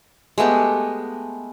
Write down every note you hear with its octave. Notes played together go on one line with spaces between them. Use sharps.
G#3 A3 B3 G4